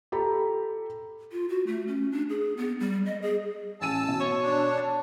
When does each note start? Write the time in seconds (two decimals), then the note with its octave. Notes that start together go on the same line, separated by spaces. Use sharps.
0.12 G4 A4 A#5 B5
1.32 F4
1.49 F#4
1.67 A3
1.88 C#4
2.12 D4
2.29 G#4
2.57 B3
2.80 G3
3.06 D#5
3.22 G#4
3.81 A1 G#5 A5 E6 D#7
4.08 B2
4.21 C#5
4.42 D4
4.77 A5